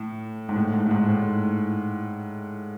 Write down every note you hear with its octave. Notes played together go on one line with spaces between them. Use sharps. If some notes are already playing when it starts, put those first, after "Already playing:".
Already playing: A2
G#2
A2
G#2
A2
G#2
A2